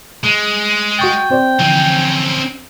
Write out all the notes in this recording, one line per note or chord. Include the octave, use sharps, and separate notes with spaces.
G#3
F#4 G5 C#6 A6
C4 C5 D5
D3 E3 F3 C4 C#4